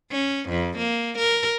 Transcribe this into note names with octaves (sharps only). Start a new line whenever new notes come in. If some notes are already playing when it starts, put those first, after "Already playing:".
C#4
F2
A#3
A#4